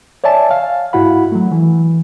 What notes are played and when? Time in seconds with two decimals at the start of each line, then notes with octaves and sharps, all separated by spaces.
0.24 C#5 D5 E5 G#5 A5
0.51 F5
0.93 G#2 E4 F#4 F#5 B5
1.32 F#3 A3
1.52 E3